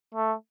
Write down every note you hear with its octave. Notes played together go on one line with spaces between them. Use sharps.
A3